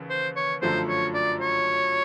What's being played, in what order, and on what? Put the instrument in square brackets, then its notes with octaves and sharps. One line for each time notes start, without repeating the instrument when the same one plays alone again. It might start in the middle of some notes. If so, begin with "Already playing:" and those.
Already playing: [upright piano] D#2 C#3 E3
[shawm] C5
C#5
[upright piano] G1 F#2 D3 F3 A3 [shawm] C5
[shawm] C#5
D5
C#5